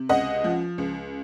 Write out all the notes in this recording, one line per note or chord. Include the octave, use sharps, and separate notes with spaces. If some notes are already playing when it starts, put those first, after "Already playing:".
Already playing: C3
C#2 D#5 F#5
F3
C#2